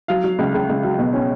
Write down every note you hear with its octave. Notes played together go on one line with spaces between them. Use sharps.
F#3 F5
F#3
C#2
C#2
C#2
F#3
B2
C#4